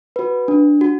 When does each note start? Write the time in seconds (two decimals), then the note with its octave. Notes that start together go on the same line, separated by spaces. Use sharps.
0.16 F#4 B4
0.48 D4
0.81 F#4